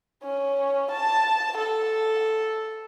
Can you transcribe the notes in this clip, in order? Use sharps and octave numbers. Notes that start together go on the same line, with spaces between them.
C#4
A5
A4